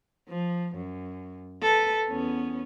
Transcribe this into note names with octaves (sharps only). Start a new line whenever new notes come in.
F3
F#2
A4 B4
E2 B3 C#4